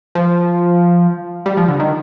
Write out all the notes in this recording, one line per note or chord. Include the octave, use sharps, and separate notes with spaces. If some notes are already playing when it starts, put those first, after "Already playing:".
F3
G3
F3
D3
D#3